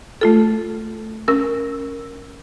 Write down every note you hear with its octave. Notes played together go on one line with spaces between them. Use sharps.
A3 F4 A4
C#4 A#4 E6